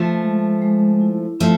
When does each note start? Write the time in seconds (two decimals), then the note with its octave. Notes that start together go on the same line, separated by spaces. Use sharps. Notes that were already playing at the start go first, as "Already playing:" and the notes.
Already playing: F3 A3
0.21 G#3
0.62 G#3
1.01 E4
1.40 F3 A3 C4